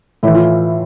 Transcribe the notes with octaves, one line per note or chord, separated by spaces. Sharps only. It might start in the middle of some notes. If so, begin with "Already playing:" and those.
A2 E3 E4
F4